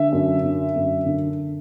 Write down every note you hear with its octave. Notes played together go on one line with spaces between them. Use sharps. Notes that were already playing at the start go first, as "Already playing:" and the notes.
Already playing: D3 E5
F#2
D3
F#2
D3